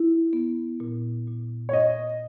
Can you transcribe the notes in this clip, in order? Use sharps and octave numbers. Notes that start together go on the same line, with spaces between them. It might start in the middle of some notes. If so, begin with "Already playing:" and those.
Already playing: E4
B3
A#2
A#2
C#5
A#2 D#5